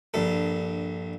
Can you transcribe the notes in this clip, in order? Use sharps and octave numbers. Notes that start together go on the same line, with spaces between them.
A#1 G2 A4